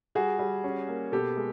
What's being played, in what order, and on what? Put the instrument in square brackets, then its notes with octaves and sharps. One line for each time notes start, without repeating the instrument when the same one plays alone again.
[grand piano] G3 F#4 G#4
G3
C#4
A#3
B2 G4 A4
G#3